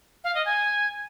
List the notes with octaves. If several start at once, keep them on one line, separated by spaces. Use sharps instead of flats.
F5
D#5
G#5